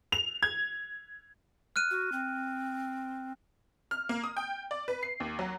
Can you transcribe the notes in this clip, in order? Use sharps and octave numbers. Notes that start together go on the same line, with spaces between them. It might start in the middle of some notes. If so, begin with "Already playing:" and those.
F7
G#6
F6 F#6 D#7
F#4
C4
F6
A#3
D#6
G5
D5
B4
C7
D#2
F#3